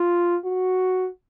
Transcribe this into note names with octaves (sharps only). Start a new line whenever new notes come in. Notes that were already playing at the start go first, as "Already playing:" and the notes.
Already playing: F4
F#4